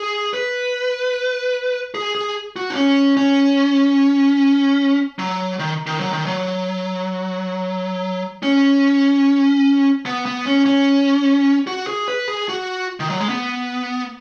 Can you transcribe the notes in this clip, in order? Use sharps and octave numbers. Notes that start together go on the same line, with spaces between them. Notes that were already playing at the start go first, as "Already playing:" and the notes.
Already playing: G#4
B4
G#4
G#4
F#4
D#4
C#4
C#4
F#3
D#3
D#3
F#3
D#3
F#3
C#4
B3
B3
C#4
C#4
F#4
G#4
B4
G#4
F#4
D#3
F#3
G#3
B3